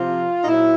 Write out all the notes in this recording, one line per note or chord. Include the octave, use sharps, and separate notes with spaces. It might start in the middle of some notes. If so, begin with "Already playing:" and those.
Already playing: C3 F3 F4
D#4
A#2 F#3 E4